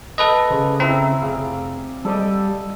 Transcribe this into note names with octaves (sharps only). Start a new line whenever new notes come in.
A4 B4 D#5
C#3 C5 D5
C4 E4 A#5
F1 G#4 D5 F5
G3 A4 D5 D#5